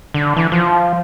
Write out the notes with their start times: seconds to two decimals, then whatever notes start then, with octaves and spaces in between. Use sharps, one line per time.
0.14 D3
0.36 E3
0.52 F3